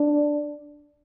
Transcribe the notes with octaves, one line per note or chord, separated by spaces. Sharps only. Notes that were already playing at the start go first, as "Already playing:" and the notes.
Already playing: D4